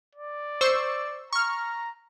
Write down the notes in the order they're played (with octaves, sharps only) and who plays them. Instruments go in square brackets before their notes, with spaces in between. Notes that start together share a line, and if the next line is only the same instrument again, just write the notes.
[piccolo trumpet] D5
[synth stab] C5 C#6 E6
[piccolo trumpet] A#5 [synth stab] C#6 F6